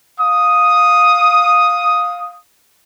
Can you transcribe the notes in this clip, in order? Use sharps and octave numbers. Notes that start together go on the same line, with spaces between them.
F5 D#6